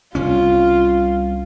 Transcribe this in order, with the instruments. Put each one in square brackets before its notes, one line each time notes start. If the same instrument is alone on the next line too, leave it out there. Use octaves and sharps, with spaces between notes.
[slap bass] C2 C#4 [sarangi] F4